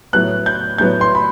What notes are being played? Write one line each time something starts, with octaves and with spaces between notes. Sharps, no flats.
A2 F#3 B3 F#6
G6
A2 F#3 B3 G6
C6
B5